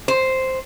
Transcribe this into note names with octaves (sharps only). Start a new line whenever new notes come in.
C5